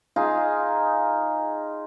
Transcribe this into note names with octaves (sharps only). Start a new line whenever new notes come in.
D#4 F4 G#4 F5